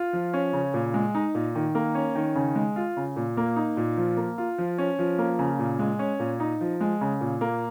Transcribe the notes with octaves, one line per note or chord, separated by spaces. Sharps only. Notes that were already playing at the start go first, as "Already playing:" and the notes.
Already playing: F4
F3
C#4
C#3
A#2
G#3
D#4
A#2
D#3
A#3
C#4
D#3
C#3
G#3
F4
C#3
A#2
A#3
D#4
A#2
F3
A#3
F4
F3
C#4
F3
A#3
C#3
A#2
G#3
C#4
A#2
D#4
F3
G#3
C#3
A#2
A#3